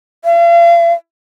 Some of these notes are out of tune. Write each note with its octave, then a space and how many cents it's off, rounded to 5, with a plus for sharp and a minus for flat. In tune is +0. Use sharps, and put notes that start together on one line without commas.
F5 -40